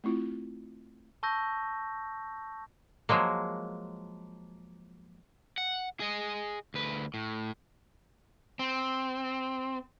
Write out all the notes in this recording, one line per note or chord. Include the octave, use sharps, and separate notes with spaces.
A3 C4 E4 F4
A5 C#6 E6 G6 A#6
F3 F#3 G#3 A#3
F#5
G#4 D#5
D2 B4
A2
C4